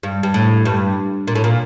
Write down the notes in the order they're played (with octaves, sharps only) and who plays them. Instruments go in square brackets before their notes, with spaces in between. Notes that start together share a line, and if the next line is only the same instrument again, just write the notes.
[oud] G2
G2
A2
G2
A#2
A2
A#2